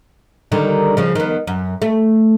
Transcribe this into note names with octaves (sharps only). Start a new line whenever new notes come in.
D3 D#3 G3
C#3 F3
D#3 B3
F#2
A3